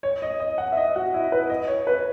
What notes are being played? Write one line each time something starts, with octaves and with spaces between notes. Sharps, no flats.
C#5
D#5
D#5
F#5
E5
D#5
F#4
E4
B4
D#5
C#5
B4